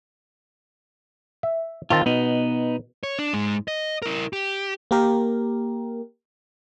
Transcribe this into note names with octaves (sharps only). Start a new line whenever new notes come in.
E5
D#3 C4 F4 A5
B2 B3 D#4
C#5
D4
G#2 G#3
D#5
E4 A#4
G4
A#3 G4 A#4